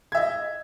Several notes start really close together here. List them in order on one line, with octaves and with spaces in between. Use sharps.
G#6 E5 D#5